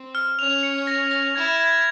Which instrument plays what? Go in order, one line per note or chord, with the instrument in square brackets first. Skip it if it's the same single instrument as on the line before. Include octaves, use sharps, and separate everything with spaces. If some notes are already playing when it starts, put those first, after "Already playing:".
Already playing: [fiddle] C4
[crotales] F6
[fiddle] C#4 [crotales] F7
[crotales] C#7
A#6
A#6
[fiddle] E4 [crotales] G#6
[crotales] G#6